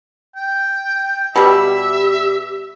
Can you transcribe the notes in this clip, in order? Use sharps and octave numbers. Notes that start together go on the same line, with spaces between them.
G5
B2 G3 G4 E5